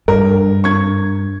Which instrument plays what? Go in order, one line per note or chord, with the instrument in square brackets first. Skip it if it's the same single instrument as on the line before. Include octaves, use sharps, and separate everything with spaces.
[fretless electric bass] G2 [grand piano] A#4
[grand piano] C#6 G#6